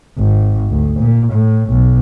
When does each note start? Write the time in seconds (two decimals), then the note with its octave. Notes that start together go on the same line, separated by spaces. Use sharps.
0.19 G#1
0.70 D2
0.99 A#2
1.32 A2
1.70 B1